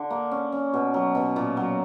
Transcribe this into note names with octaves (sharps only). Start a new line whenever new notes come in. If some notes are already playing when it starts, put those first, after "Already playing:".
Already playing: D3
A#3
C#4
C#4
B2
F#3
B2
A#2
F#3